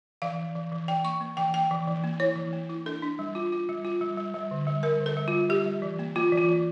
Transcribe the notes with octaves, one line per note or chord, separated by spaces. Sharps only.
E3 F5
E3
E3
E3
E3 G5
A#3 C#6
A#3
E3 G5
A#3 G5
E3
E3
A#3
E4 C#5
E3
A#3
E4
D4 A4
D4
G3
F4
F4
G3
F4
G3
G3
G3
D3
G3
G3 A#4
D3
A4
G3
F4
G3
G3 G4
G3
E3
A#3
A#3 F4
E3
F4
E3